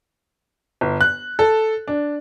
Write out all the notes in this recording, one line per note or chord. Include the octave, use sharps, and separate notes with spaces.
G1
F#6
A4
D4